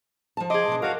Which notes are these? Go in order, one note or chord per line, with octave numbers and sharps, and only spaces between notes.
F3 A5
G#4 D#5 C6 D6
B2 D4
F#4 A#4 C#5 F5